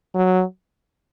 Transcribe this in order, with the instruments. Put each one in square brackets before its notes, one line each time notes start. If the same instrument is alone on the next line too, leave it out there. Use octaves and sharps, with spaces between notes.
[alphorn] F#3